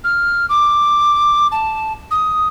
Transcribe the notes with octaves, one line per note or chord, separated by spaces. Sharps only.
F6
D6
A5
D#6